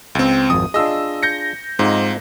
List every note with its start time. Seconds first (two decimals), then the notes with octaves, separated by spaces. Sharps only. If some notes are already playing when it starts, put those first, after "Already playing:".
0.15 C#2 C4
0.50 G#1 F2 D#6
0.74 D4 F4 G#4 D#5 E6
1.23 G6 A#6 C#7
1.79 G#2 C4 D#4 F4